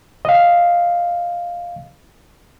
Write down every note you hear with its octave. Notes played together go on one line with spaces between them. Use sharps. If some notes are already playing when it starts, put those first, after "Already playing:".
D#5 F5